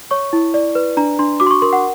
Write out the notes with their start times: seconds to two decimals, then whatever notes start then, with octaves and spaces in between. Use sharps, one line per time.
0.11 C#5 C#6
0.33 E4
0.54 D5
0.75 B4
0.97 D4 A#5
1.19 D4 C6
1.40 F#4 D6
1.46 C6
1.51 C#6
1.62 A#4 C6
1.73 F#5